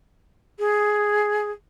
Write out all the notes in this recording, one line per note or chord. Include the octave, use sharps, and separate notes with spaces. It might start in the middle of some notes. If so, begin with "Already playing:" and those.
G#4